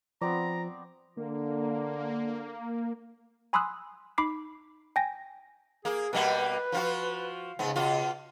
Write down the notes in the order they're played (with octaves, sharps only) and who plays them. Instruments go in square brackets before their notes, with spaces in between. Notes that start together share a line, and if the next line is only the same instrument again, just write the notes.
[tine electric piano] F3 [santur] B3 C4 D5 [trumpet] A#5
[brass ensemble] D3 [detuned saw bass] A#3
[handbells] G#5 B5 C6 D#6 E6 F#6
D#4 B5 D6 C7
G5 G#5 A#6
[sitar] A#3 [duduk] G#4
[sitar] B2 G3 A#3 [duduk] B4
[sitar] F3 F4 F#4
[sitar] G#2 B3 [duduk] C#3
[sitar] B2 F4